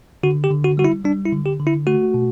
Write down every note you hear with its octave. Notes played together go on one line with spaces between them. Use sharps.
D3 F#4
G4
D3
F#4
G3 F#4
E4
G3 D4
E4
D3
G4
D3
E4
A3 F#4
B2